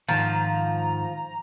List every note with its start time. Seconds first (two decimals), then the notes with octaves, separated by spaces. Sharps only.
0.09 G#2 D#3 F3 A#5